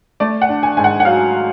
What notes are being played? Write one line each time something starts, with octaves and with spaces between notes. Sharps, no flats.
A3 D5
F#5
D4
G#5
G#2 G#5
F#5
F#5
F#3 F5